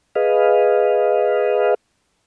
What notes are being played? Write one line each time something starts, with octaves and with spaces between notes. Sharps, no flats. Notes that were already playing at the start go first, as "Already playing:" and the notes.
G#4 B4 D#5 F5